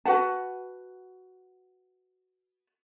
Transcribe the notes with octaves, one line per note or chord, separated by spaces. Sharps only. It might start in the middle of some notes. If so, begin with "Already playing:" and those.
F#4 B4 F#5 A5